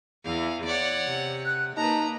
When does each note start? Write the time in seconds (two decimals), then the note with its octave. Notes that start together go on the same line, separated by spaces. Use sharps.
0.25 E2 E3 F5
0.66 C#5 D5 F#5
1.07 C3
1.45 F#6
1.77 A#3 D#4 B4 A5 A#5